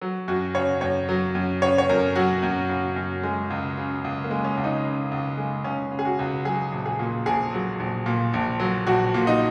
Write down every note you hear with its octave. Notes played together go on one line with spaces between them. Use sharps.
F#3
F#2 F#4
C#3 C#5
F#2 C#5
F#3
F#2
C#3 C#5
C#5
F#2 A#4
F#3 F#4
F#2
C#3
F#2
G#3
C#2
C#3
C#2
A#3
G#3
C#4
C#2
D#4
C#3
C#2
G#3
C#2 C#4
C#3
G#4
F#4
C#2
F#3 G#4
A#1
G#4
A#2
A#1 G#4
F#3
A#1
A#2
A#1
F#3
A#1 F#4
A#2
D#4